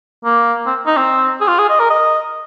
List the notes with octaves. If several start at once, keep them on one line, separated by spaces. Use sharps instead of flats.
A#3
C4
D#4
C4
G#4
F4
G#4
D#5
A#4
D#5